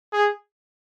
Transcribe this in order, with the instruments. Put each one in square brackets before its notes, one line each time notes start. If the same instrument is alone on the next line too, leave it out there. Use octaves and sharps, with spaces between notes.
[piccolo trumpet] G#4